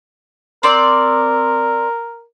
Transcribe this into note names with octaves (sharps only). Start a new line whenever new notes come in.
C4 A#4 D5